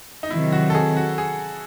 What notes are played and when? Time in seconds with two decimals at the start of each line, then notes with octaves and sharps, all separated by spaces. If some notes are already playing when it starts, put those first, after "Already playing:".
0.23 D#4
0.30 C3 D#3 F#3 E4
0.52 F#4
0.70 A4
0.75 G#4
0.97 F#4
1.18 G#4